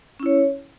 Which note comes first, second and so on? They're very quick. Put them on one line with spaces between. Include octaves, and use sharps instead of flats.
C#4 E4 C#5